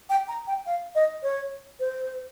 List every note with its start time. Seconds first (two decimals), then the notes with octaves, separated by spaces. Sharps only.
0.10 G5
0.28 A#5
0.47 G5
0.66 F5
0.95 D#5
1.23 C#5
1.80 C5